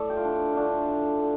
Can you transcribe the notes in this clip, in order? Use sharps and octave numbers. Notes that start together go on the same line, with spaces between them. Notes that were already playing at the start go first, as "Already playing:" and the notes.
Already playing: A2 A3 A4 D5
G4
F4
D4
D3 A3 D4 F4
D3